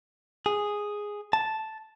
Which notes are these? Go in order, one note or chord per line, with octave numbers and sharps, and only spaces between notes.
G#4
A5